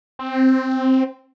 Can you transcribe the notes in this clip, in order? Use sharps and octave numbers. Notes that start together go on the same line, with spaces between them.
C4